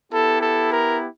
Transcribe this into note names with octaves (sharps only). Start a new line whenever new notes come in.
B3 E4 G4 A4
A4
A#4